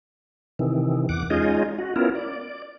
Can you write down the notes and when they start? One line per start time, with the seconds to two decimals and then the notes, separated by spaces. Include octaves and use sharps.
0.59 C3 D#3 E3
1.09 E2 F#5 D6
1.30 G#3 C#4 D#4 F4 G#4 D#5
1.79 F#4
1.96 B3 C#4 E4 F4 A#4
2.15 D5